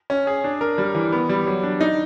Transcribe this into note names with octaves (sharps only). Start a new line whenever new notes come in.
C#4
G#4
D4
A#4
G3
E3
B3
G3
F#3
D4
D#4